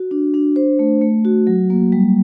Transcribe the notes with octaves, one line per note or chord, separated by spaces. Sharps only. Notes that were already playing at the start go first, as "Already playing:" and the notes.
Already playing: F#4
D4
D4
C5
A3
A3
F#4
F#3
A#3
G3